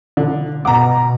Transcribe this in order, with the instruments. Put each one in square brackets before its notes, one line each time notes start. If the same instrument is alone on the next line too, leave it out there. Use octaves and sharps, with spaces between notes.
[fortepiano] D3
[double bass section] B2 [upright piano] F#5 A#5 [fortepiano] D6